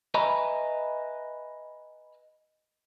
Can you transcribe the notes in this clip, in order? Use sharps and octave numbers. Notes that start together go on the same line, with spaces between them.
B4 D#5 E5 G#5 A#5 B5